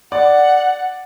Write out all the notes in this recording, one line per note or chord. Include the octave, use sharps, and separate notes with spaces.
D5 F#5